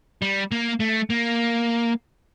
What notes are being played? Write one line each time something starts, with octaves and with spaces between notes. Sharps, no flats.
G3
A#3
A3
A#3